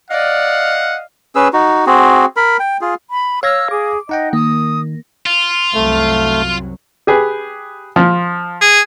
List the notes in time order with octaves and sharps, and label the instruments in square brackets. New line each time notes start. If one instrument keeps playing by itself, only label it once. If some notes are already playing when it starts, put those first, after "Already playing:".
[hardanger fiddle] D5 [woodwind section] D#5 F5 [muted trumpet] F#5
[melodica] C#4 G#4 B4 E6
D#4 F#4
C4 F#4 G#4
A#4 B5
G5
F4 G#4
[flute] B5
[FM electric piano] C#5 F6 [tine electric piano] F5 G#6 A#6 [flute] E6
[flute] G#4 [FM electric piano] D6
[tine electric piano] D#4 F#5 G5 [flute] D#5
[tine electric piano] D#3 [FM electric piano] A#3 [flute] D#6
[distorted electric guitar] F4
[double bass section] C2 F#2 F#3 [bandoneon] A3
[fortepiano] G4 G#4 B4
F3
[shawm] G#4